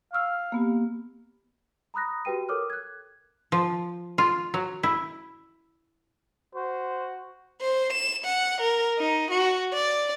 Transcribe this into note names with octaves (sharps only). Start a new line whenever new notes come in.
F5 C#6 E6 F6
A#3 B3 G4
A#5 B5 D#6 F#6 A#6
F#4 G4 B4 G5 D#7
A4 A#4 C#5 D6 D#6 F6
F#6 G#6
F3
F4
F#3
E4
F#4 C5
C5
E7
F#5
A#4
D#4
F#4
D5